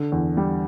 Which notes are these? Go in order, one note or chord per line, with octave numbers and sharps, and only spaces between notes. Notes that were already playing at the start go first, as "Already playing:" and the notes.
Already playing: D3
E2
G3